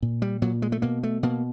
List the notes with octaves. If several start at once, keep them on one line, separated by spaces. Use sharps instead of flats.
A#2
G3
A#2 F#3
G#3
A3
B2 A#3
A3
B2 A#3